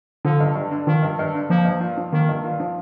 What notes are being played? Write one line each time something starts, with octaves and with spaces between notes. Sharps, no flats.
D3 F3
G2
G2
D3
D#3 F3
G2
G2
D3
F3 A#3
G2
F4
F3
D#3 A#3
G2
F4
F3